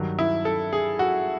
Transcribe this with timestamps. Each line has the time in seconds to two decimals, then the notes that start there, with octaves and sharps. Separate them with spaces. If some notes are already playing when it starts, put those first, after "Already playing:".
Already playing: G2 D#3 F#3
0.19 E4
0.45 A4
0.73 G#4
0.99 F#4